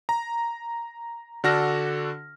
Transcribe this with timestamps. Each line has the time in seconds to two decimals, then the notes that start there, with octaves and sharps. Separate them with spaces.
0.09 A#5
1.44 D3 D4 F#4 A4 F6 A#6